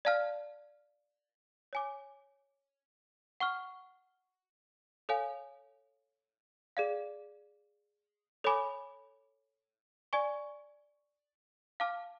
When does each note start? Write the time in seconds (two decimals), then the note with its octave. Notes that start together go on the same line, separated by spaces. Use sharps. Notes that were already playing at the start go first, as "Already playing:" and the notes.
0.05 D5 F5 A5 F6
1.73 C#5 G#5 D6
3.40 F#5 C#6 F6
5.09 A4 C#5 F5 G#5
6.77 G#4 D5 F5
8.44 A4 C#5 G#5 B5 D6
10.13 D5 G#5 C#6
11.80 F5 A5 D6 F6